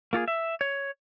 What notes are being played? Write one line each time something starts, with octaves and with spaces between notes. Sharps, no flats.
A#3 F4 F#4 G#4
E5
C#5